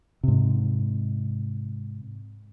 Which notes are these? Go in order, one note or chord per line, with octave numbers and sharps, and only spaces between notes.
G#2 C3